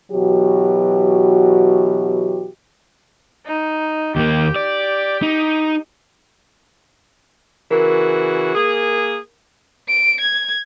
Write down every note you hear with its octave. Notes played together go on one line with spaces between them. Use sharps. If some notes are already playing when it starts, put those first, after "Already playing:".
B2 E3 F#3 F#4 G4
D#4
D#2 A#3 G4
D5
D#4
C#3 E3 F#4 A#4
A#3 G#4
D7
G#6